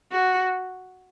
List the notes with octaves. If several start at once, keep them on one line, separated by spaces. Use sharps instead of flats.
F#4